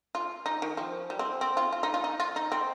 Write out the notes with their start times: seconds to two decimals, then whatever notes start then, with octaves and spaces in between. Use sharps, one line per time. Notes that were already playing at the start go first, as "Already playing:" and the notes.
0.15 F4
0.46 D#4
0.62 D#3
0.77 F3
1.10 G3
1.19 C4
1.41 C4
1.57 F4
1.72 F4
1.83 D#4
1.94 F4
2.04 D#4
2.20 F4
2.36 D#4
2.52 C4